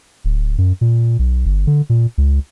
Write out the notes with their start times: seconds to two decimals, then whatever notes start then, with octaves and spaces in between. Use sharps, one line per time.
0.24 D1
0.58 F#2
0.81 A#2
1.19 B1
1.46 G1
1.67 D3
1.90 A#2
2.18 C#2